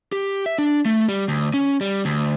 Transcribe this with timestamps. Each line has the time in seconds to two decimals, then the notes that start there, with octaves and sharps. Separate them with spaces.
0.12 G4
0.46 E5
0.58 D4
0.85 A3
1.09 G3
1.28 D2
1.54 C#4
1.81 G3
2.05 D2